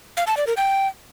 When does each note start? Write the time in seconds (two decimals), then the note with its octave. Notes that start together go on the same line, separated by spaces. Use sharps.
0.17 F5
0.27 A5
0.37 D5
0.47 A#4
0.57 G5